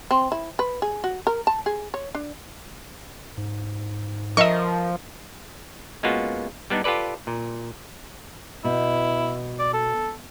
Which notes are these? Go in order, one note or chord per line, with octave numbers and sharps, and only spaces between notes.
C4
E4
B4
G#4
F#4
A#4
A5
G#4
C#5
D4
G#2
F3 A#4 D#5 E5 C#6
G#3 A#3 B3 C#4 F4 F#4
G3 B3 D4 D#4
F4 G4 A4 B4 D5
A#2
B2 E4
D5
A4